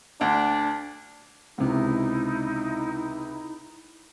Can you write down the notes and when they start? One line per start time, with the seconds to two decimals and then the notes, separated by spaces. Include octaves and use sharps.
0.21 D2 D4
1.58 C#2 C3 D#4 E4